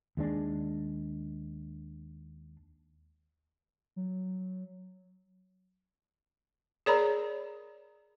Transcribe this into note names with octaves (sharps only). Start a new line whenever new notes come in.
D#2 G#3 D4
F#3
G#4 A#4 C#5 D5 A#5 B5